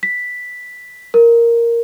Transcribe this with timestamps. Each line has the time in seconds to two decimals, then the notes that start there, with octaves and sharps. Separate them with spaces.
0.03 B6
1.14 A#4